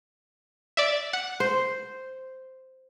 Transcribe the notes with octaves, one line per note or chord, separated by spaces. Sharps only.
D5 E5
F#5
C5